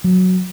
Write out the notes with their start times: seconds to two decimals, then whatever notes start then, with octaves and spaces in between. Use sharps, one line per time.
0.04 F#3